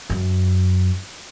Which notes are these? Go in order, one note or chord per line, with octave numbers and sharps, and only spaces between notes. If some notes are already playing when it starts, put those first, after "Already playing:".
F#2